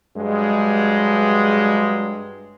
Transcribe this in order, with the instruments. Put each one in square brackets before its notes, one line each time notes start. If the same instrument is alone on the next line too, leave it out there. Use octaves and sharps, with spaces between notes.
[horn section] G2 F#3 G#3